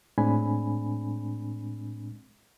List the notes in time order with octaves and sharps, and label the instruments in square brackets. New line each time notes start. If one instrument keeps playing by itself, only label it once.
[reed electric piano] A2 G#3 C4 D4 G#5 B5